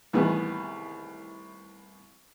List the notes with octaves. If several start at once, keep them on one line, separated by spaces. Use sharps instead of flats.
C2 A2 D#3 E3 G#3 B3